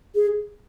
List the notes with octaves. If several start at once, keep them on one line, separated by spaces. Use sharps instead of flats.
G#4